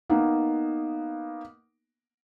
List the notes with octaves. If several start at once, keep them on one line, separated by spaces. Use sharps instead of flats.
A#3 B3 D#4